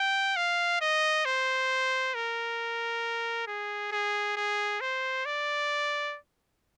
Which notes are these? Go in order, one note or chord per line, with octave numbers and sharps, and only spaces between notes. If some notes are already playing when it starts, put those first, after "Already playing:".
Already playing: G5
F5
D#5
C5
A#4
G#4
G#4
G#4
C5
D5